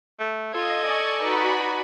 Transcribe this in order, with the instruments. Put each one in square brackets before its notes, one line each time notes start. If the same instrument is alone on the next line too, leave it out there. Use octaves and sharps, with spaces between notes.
[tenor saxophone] A3
[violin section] F4 [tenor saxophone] A4 [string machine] D#5 [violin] G#6
[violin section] D5 G#5 C#6
[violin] D#4 B4 [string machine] F#4 B5